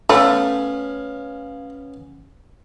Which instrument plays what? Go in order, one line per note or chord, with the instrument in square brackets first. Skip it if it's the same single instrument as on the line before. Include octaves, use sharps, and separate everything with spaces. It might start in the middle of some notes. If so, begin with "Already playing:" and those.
[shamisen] A3 [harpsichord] B3 C#4 [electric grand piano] F5